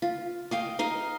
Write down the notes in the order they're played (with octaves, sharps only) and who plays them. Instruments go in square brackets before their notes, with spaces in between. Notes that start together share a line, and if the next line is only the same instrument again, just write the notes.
[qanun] F4
D#5 F5 G5
D#4 D#5 F5